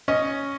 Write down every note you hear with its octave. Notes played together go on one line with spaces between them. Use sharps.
C#4 D#5